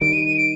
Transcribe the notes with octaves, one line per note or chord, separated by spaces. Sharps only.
D#3 G3 D7
D#7
D#7
D7